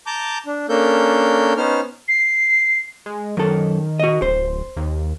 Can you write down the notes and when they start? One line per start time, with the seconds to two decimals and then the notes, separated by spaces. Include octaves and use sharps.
0.07 A5 A#5 D6 G6
0.46 D4
0.69 A#3 C#4 D4 A4 A#4 G6
1.57 B3 C#4 D#4 C5 F6
2.08 C7
3.06 G#3
3.37 F#2 D#3 A4
4.00 F#4 D#5
4.22 D1 C5
4.77 D#2